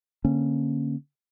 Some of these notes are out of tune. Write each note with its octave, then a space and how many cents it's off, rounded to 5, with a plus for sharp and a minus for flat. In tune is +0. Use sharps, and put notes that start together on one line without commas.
D3 -10 A#3 +0 C#4 -20